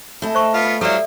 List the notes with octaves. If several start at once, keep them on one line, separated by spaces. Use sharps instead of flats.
A3 E4 D#5 G#5 A5
C5 C#6
B3 F4 F5
F#3 G3 E4 A4 C5 D5 E5 F5